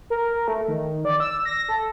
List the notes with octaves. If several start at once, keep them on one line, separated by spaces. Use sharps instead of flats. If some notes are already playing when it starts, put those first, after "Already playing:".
A#4
A3
D#3
D5
E6
A#6
A4